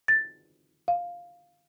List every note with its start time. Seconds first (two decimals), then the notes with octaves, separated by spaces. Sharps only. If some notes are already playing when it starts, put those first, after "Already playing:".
0.08 A6
0.88 F5